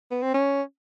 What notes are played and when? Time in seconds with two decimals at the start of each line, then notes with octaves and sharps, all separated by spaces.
0.11 B3
0.22 C4
0.34 C#4